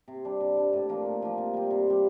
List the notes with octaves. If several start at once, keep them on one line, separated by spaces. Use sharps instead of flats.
C3
G3 D4
C3
G3 D4
A2
F3 A#3 F4
A2
F3 A#3 F4
C3
G3 C4
C3
G3 C4